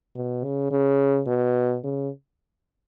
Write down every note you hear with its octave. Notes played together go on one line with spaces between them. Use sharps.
B2
C#3
C#3
B2
C#3